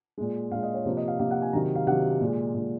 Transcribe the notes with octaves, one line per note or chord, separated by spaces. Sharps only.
A#2 G#3
A#2 G#3 F5
D#5
C#5
C3 F3 A#3 C5
D#5
F5
C3 F3 A#3 F5
F#5
G#5
C3 D#3 F#3 A#5
F5
C3 D#3 F#3 F#5
A#2 G#3
A#2 G#3